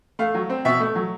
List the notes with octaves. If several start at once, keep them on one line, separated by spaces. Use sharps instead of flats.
A3 F5
F#3
C4
B2 E5
A3
F#3